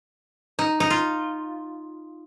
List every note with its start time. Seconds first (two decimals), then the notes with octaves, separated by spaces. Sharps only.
0.59 D#4
0.80 D#4
0.90 F4